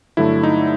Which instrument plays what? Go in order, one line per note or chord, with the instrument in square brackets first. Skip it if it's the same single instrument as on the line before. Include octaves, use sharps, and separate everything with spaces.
[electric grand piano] G2 D3 F#3 A3 E4
D#4